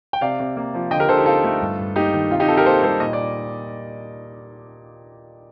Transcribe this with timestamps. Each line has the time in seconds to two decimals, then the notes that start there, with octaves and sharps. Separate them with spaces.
0.13 G5
0.21 C3 D5 F5
0.40 C3
0.57 A#3
0.74 F3
0.91 D3 D#5 G5
1.00 G4 A#4
1.08 D3 A4 C5
1.17 D#4 G4
1.26 C4 F4 A4
1.44 A3
1.61 G2
1.79 G2
1.96 A#3 D#4 G4
2.13 D#3
2.31 C3 F4
2.40 D#4 G4
2.48 C3 F4 A4
2.57 G4 A#4
2.65 A#3 A4 C5
2.83 G3 A4 C5
3.00 A#2 D#5
3.13 D5